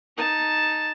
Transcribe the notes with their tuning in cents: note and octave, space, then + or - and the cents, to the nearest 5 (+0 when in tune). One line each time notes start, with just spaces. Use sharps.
D#4 +0 A5 +5